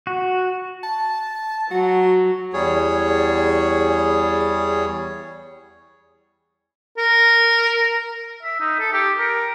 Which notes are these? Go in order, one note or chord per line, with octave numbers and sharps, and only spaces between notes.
F#4
A5
F#3 F#4
E2 G3 G#4 C#5
A#4
E5
D#4
A4
G4
A#4